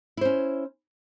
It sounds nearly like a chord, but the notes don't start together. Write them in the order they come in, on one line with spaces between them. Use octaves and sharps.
E4 C5 C#4